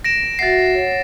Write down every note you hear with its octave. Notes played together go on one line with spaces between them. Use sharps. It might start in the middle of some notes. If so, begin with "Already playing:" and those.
A#6 D7 E7
F#4 E5 F#5 A6 C7
C#5 F#5